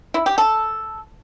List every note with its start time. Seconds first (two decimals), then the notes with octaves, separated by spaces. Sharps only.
0.14 E4
0.26 G4
0.38 A4